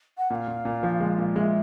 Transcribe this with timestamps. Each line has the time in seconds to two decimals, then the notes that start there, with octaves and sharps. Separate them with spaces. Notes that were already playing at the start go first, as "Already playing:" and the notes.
0.18 F#5
0.30 A#2 F5 F#5
0.48 A#2
0.65 A#2
0.83 F3
1.00 G#3
1.18 A#2
1.36 G#3 F5
1.40 E5